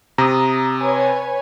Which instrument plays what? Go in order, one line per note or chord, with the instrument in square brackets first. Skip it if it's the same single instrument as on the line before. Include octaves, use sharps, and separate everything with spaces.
[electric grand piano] C3 [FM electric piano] A#5 D#6
[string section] B4 C#5 G#5